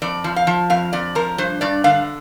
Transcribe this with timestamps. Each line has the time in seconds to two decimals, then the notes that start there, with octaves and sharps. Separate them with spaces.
0.02 F2 D5
0.24 F3
0.36 F5
0.47 F3
0.70 F2 F5
0.93 F2 D5
1.15 F3 A#4
1.38 G2 C5
1.61 G2 D5
1.84 D3 F5